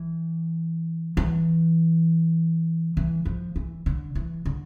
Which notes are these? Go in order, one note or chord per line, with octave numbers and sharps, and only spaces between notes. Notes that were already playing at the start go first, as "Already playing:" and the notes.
Already playing: E3
E3
E3
F3
E3
D3
E3
D3